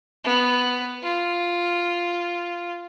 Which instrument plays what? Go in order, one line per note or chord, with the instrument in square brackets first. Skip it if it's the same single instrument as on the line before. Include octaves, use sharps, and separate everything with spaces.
[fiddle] B3
F4